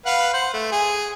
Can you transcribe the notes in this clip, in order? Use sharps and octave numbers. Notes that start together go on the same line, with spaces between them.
B4 F5 F#5
C5 F#5
A3
G#4